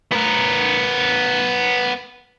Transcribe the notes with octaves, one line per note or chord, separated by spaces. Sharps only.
B3 A#4